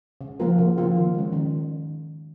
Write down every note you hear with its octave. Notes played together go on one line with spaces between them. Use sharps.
C#3
F3 A#3 F4 A#4
C#3
F3 A#3 F4 A#4
D#3
G#3 C#4
D#3